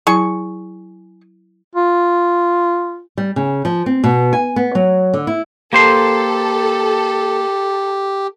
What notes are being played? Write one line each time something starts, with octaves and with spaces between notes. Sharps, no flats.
F#3 E4 G#4 C#6
F4
G3
C#3
F3
C4
B2
G#5
B3
F#3
D3
E4
A#3 G4 A4 C5 C6